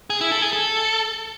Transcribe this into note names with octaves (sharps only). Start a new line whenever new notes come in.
G#4
E4
A4
G#4
A4